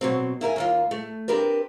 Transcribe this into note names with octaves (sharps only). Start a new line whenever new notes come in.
B2 F#3 C4
E4 A#4 E5 G#5
D#2 A#3 F4
A3
C4 D4 G4 A#4 B4